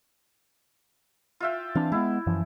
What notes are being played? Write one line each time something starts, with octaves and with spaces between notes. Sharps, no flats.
F4 E5 G5
E3 C4 D4 F5
G#3 B3 E4
F#2 E3 F3